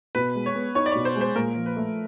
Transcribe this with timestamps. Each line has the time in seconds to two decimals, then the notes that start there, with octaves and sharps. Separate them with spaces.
0.15 B2 B4
0.35 G#3
0.46 C#5
0.55 B3
0.75 D#4 C#5
0.86 D5
0.91 B2 C#5
1.05 C5
1.16 G#3
1.21 C5
1.36 A#2 A#4
1.55 F3
1.66 B4
1.77 A3